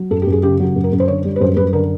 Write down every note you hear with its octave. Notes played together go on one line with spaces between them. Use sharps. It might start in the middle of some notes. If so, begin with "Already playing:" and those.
Already playing: F#3
F#2 A4
G4
F#2
G#4
C#3 G4
F#3
F#2
A#4
F#2
C5
D3 C#5
G3
B4
F#2 C5
F#2 B4
D3 A#4